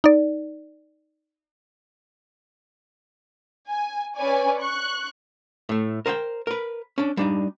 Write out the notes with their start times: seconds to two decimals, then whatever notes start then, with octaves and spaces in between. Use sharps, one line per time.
0.04 D#4 D5
3.68 G#5
4.15 C#4 B4 C#5 D5 G#5
4.61 C#6 F#6
5.69 A2 A3
6.06 A#4 C5 D#5 G5
6.47 A#4 B4
6.98 C#4 D4
7.17 G3 D4 D#4